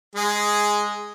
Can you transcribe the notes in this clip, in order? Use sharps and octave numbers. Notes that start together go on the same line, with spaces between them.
G#3 G#4